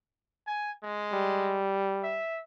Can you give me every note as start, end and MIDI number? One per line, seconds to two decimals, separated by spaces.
0.47 0.71 80
0.83 1.61 56
1.12 2.22 55
2.03 2.41 76